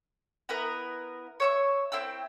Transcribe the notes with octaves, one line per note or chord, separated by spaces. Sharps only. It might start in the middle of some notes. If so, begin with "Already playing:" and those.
B3 E4 A#4 B4
C#5 E5 C#6
C4 E4 G5 E6